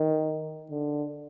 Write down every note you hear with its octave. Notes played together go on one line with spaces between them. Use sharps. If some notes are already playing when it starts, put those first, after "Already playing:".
Already playing: D#3
D3